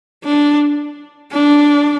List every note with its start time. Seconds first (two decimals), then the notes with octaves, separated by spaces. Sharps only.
0.25 D4
1.32 D4